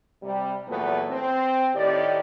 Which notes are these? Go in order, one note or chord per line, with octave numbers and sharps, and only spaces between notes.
C3 G3
E2 A#2 F#3 A3 B3
C4
A2 D#3 G4 D5